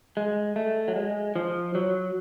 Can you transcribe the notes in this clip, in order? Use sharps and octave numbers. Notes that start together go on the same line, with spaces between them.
G#3
A3
F#3
G#3
F3
F#3